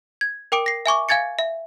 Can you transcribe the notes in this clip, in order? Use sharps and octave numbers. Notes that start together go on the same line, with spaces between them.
G#6
A#4 G5 D6 D7
A#6 C7
E5 G#5 C#6 D6
F5 G#5 G#6 A6 C#7
E5